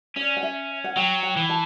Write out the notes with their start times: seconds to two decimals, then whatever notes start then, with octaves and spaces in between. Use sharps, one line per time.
0.16 C#4 D5
0.37 F#5
0.43 E5
0.84 F#5
0.96 F#3 G5
1.23 G5
1.37 E3
1.49 A5